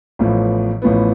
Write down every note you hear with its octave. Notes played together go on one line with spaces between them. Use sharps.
A1 A2 F3 B3
A1 A2 F3 B3